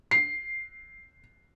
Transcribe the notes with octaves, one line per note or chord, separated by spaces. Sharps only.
C7